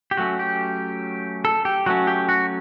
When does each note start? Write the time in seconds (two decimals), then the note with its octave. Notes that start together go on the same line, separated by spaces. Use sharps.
0.11 G4
0.17 F#3 A3 C#4 F#4
0.39 G4
1.45 A4
1.65 G4
1.86 F#3 A3 C#4 F#4
2.07 G4
2.29 F#4